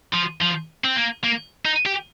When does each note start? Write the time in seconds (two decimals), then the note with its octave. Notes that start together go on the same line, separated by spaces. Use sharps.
0.14 F3
0.42 F3
0.85 C4
0.96 A#3
1.24 A#3
1.65 D#4
1.86 G4